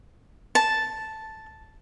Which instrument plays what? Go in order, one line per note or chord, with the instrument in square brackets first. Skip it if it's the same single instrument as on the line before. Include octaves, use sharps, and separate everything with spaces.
[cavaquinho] A5